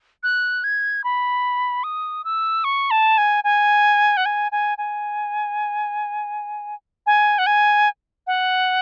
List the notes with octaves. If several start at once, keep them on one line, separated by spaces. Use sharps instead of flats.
F#6
G#6
B5
D#6
E6
C#6
A5
G#5
G#5
F#5
G#5
G#5
G#5
G#5
F#5
G#5
F#5